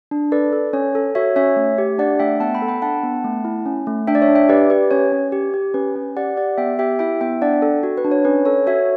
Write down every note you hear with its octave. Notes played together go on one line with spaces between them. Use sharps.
D4
A4 B4 D5
A4
C#4 C#5
A4
F#4 C#5 E5
C#4 C#5 E5
A3
G4
D4 D5 F#5
A3 E5 G5
B3 F#5 A5
G5 B5
A4
G5 B5
D4 F#5 A5
B3
A3
E4
C#4
A3
D4 E5 G5
D5
C#5 E5
D4
E5 G5
G4 B4 D5
G4 B4
C#4 C#5
C#4
G4
G4
C#4 B4
C#4
G4 D5 F#5
G4 D5 F#5
B3 E5 G5
G4 E5 G5
E4 E5 G5
B3 E5 G5
D4 D5 F#5
A4
F#4
B4
D4
C#5
C#4 B4
A4 C#5
F#4 C#5 E5